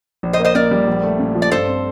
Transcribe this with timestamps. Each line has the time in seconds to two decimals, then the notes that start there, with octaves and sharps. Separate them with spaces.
0.23 A#1
0.33 C5 D#5
0.39 A#3
0.45 C5 D#5
0.55 A#2 A#4 D5
0.71 G3
0.87 A#1
1.03 A3
1.19 A#2
1.35 F3
1.42 D5
1.51 G2 A4 C5
1.67 C4